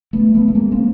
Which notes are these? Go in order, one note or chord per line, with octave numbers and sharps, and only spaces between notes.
A3 B3
A3 B3
A3
G#3 A#3
A#3 C4